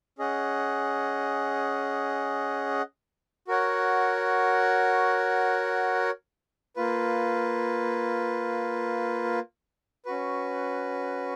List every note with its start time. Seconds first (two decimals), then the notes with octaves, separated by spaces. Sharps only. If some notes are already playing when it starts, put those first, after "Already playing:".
0.19 C#4 G#4 D#5 F#5
3.48 F#4 A#4 C#5 F#5
6.76 A#3 F4 B4
10.05 C#4 F#4 B4